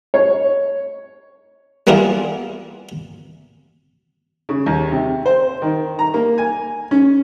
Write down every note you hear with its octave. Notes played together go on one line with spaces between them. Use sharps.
C#5
G3 A#3 B3 E4 F4 G#4
C#3
D#2
C3
C5
D#3
A#5
A#3
G#5
C#4